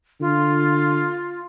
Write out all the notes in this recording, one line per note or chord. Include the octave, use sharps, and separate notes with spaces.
D3 F4